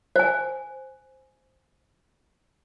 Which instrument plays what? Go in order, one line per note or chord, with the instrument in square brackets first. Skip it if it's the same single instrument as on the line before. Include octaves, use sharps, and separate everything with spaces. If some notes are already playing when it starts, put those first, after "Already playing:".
[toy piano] C5 G#5